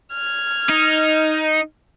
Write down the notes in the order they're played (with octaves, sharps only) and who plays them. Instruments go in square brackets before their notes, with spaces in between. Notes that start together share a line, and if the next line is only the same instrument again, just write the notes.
[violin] F6 G#6
[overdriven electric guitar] D#4